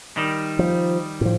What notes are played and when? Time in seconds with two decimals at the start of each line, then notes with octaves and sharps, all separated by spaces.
0.17 D#3 G3
0.59 F3
1.21 A2 F3